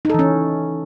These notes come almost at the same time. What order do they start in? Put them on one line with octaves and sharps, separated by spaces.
D#4 A4 E3 C#4